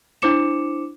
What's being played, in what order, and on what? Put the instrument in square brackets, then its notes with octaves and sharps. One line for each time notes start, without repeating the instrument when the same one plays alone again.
[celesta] D4 E4 C5 D6 C#7 E7